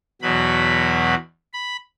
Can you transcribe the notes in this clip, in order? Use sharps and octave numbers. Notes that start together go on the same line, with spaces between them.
E2 B2 F#3 B5
B5